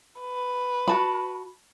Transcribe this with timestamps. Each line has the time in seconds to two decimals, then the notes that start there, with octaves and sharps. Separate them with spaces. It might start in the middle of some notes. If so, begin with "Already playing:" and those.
0.20 B4
0.88 F#4 A5 B5